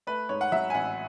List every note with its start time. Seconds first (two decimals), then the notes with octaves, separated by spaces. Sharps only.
0.07 A3 B4
0.29 G#2 C#5
0.41 F#5
0.52 F#3 E5
0.70 G#5
0.74 A1 F#5